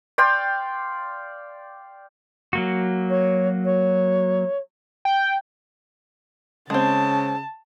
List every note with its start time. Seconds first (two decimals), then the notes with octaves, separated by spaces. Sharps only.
0.18 D5 F5 G5 C6
2.53 F#3 A#3 F#4
3.10 C#5
3.65 C#5
5.05 G5
6.70 C#3 G#3 C4 A5